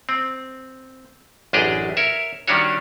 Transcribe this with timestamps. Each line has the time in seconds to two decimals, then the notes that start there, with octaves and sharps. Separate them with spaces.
0.09 C4
1.53 A1 F#2 D4 G4 G#4 D#5
1.97 A#4 C#5 E5
2.48 D#3 G3 C#4 D4 F#4 C#5